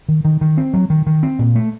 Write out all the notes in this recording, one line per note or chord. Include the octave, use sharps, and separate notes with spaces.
D#3
D#3
D#3
C4
F#3
D#3
D#3
C4
A#2
A3